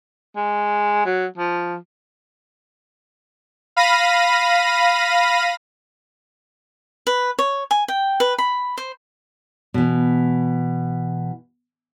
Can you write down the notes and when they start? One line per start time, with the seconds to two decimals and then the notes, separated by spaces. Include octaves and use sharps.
0.36 G#3
1.06 F#3
1.37 F3
3.76 F5 B5 A#6 D#7
7.07 B4
7.39 C#5
7.71 G#5
7.88 G5
8.20 B4
8.38 B5
8.78 C5
9.74 B2 E3